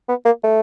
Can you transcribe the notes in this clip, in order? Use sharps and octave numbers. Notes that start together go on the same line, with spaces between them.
B3
A#3
A3